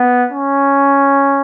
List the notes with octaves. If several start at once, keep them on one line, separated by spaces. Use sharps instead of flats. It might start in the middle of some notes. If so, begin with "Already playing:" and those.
Already playing: B3
C#4